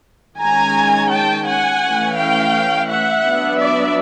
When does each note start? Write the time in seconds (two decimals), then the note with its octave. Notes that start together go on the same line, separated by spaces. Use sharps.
0.40 D#3 G#3 C#4 G#5 A#5
1.11 G5 A5
1.46 F#5 G#5
1.82 E3 A3 C#4
2.17 F5 G5
2.87 E5 F#5
3.23 F#3 B3 D4
3.58 D5 E5